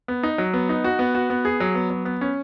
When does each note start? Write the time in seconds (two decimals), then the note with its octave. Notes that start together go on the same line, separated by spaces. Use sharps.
0.08 B3
0.23 D#4
0.38 F#3
0.54 B3
0.69 D#4
0.84 F#4
0.99 B3
1.15 F#4
1.30 B3
1.45 G#4
1.60 F#3
1.75 B3
1.90 F#3
2.05 B3
2.21 C#4